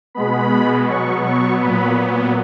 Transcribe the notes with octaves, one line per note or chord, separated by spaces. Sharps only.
B2 G#3 B3 B5
B2 F#3 B3 C#6
C#6
A#2 F#3 B3 B5